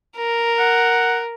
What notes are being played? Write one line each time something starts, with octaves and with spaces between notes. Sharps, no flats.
A#4
F#5